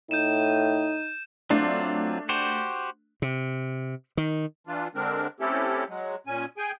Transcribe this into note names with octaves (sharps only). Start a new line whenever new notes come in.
A2 D#4 G6 D#7 E7
F#3 A3 C4 D4 F4
F#4 G4 C5
C3
D#3
E3 D4 F4
D3 G#3 C4 D4 A#4
A3 C4 C#4 E4 G4 A4
F#3 G#3
A#2 C#4 G#5
G#4 G5 G#5